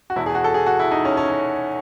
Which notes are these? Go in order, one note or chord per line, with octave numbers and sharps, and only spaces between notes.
F#4
E2 B2 E4
G#4
F#4
A4
G#4
F#4
E4
D#4
C#4
C#4
C#4